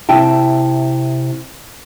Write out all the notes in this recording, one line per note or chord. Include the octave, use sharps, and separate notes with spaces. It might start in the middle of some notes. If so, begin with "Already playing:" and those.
C3 E4 G5 A5